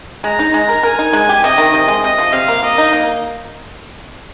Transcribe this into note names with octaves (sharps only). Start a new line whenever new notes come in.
G#3 A#5
D#4
G#3 A#5
A#4
A#4 G#5
D#4
G#3
G4
C3 D#5
D#3
C3 D#5
G#3
C3 D#5
F3
C3 F5
A#3
A#3 D#5
D#4
A#3